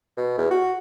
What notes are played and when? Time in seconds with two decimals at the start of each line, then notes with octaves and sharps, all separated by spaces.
0.17 B2
0.38 E2
0.50 F#4